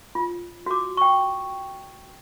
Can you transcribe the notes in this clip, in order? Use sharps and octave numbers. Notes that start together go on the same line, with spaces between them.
F4
F#4 D6
G5 C#6